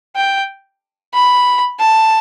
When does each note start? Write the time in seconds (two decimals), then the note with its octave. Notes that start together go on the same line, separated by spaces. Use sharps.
0.16 G5
1.14 B5
1.80 A5